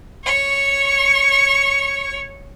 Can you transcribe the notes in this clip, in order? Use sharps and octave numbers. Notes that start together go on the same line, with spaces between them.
C#5 C#6